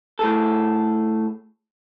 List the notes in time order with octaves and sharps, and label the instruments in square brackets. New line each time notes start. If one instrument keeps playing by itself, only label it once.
[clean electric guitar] A2 G#4 A4